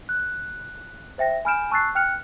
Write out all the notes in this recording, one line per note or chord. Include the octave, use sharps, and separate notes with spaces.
F#6
C5 E5 G5 A#6
G#5 B5 F6 G6 D7 E7
A5 C#6 E6 F#6 A6 C7
G5 F6 F#6 C#7 F7